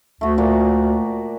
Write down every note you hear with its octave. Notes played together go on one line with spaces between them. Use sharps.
D2 A3 F#4
A#2 F#4 D5